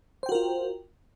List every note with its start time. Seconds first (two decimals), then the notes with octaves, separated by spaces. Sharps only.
0.23 C5
0.26 G5
0.29 F#4
0.32 A#4
0.35 F4